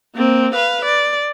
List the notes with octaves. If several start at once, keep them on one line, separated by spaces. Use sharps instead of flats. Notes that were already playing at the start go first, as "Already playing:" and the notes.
A#3 C4
B4 F5
D5